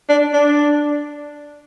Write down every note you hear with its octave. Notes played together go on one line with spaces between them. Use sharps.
D4
D4